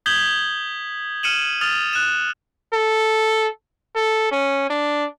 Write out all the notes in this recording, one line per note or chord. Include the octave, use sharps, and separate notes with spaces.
D#6 G6 G#6 B6 F#7 G7
F6 C#7 D#7 E7 F#7
D#6 F6 A6 F7
F#6 E7
A4
A4
C#4
D4